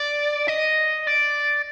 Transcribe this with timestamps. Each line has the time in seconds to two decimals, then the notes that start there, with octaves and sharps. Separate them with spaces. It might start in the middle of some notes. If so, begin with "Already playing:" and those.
Already playing: D5
0.48 D#5
1.07 D5